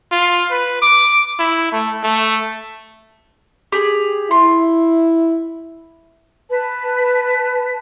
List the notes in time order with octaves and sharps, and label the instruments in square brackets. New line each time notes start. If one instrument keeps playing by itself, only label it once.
[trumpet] F4
B4
D6
E4
A3
A3
[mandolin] G4 G#4
[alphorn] E4 [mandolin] C6
[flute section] B4 A5